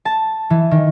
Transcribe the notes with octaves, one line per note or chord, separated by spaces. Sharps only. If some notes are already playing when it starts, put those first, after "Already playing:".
A5
E3
D#3